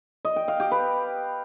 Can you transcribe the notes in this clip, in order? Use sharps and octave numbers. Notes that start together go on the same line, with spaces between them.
D#5
G5
F5
G4
B4